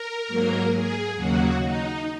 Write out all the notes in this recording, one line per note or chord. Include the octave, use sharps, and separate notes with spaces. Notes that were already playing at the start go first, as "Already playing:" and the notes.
Already playing: A#4
G#2 F#3 A#3
G#4
D#2 C#3 F#3 A#3 F#4
D#4